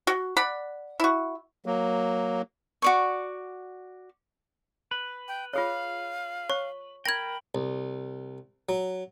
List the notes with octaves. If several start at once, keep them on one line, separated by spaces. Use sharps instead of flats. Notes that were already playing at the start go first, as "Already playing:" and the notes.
F#4
D5 F#5 B5
E4 F#4
F#3 A#3
F#4 D5 C#6
B4
G5
F4 G#4 C#5 F5
C#5 C#6
A#4 G5 B5 G#6 A#6
C2
F#3